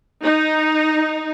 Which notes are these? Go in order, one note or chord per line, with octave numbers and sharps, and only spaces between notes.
D#4